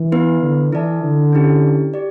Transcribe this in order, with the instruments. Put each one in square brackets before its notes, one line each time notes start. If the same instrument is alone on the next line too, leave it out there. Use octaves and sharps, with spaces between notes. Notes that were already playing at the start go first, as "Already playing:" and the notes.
Already playing: [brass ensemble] E3
[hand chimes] B3 E4 B4
[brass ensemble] D3
[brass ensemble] E3 [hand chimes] E4 A4 D5 A5
[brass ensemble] D3
[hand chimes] C#4 E4 G4
G4 D5